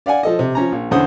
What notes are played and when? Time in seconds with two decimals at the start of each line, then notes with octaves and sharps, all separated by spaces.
0.06 D5 F5 F#5 G#5
0.23 F3 A4 D#5
0.39 C3
0.55 F3 C#4 A#5
0.72 A#1
0.91 E2 D3 C#4 C5 F#5 D#6